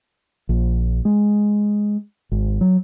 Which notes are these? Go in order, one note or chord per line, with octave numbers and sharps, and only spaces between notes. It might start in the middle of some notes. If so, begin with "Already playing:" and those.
A#1
G#3
G#1
F#3